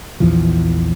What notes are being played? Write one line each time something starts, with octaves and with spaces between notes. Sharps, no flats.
A#1 E2 E3 F3